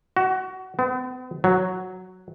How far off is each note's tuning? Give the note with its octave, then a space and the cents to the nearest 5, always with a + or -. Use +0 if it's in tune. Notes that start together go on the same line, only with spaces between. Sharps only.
F#4 +20
B3 +45
F#3 +0